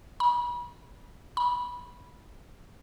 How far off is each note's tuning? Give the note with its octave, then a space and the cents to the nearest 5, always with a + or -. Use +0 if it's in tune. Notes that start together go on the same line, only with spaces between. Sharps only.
B5 -35
B5 -15